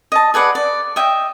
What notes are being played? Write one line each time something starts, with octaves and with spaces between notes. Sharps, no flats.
D#5 A5
G#4 B4 D5 F#5
D5
D#5 E5 G5